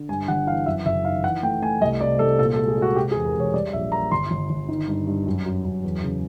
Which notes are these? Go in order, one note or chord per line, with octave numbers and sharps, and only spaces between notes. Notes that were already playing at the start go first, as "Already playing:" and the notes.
Already playing: D3
G2 G#5
G1 F#5
E3 F5
F#2 E5
F#1 E5
D#3 F5
E3 F#5
A3 G5
A3 G#5
C2 D#5
C3 D5
C2 A4
A#2 A4
A4
G#3
G#4
G#3 F#4
C3 G4
G#4
E2
A#4
E1 C#5
G3 D5
A#1 E5
A#3 A#5
G1 C6
G1
G1
D#3
G2
G2
F#2
F#2
F#2
E2
C#3